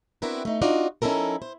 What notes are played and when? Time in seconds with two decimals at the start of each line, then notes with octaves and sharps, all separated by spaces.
0.22 C4 D4 E4 F#4 A#4 B4
0.45 A3 D#4
0.62 D4 D#4 F4 F#4 D5 D#5
1.02 F3 C#4 D#4 E4 A4 A#4
1.42 C5